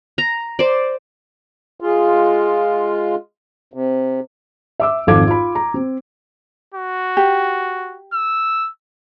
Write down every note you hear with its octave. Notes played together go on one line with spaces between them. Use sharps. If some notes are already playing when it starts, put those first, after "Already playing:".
A#5
C5 D5
G#3 F4
C3
E5 D6 E6
G#1 F2 A4 F5 D6 G#6
F4 B5
A#5
C4
F#4
G4
E6